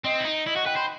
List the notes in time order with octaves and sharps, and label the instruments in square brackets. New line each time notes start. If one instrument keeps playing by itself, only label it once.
[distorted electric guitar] C4 [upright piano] D#5
[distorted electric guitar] E4
D#4
[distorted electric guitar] E4 [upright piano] D#5
[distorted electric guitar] F#4 [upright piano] F#5
[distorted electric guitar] B4 [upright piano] G5
[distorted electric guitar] C5 [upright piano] B5